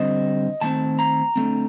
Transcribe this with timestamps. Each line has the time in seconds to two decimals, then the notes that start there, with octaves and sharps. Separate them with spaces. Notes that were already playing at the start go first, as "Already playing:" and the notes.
Already playing: D3 G3 C4 D#5
0.61 D#3 A3 C4 A5
0.99 A#5
1.36 D3 A3 C4